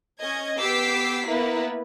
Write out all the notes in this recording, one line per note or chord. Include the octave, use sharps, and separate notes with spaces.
C#4 D#5 G#6
B3 G4 D6 E6 B6 C7
A#3 B3 E4 B4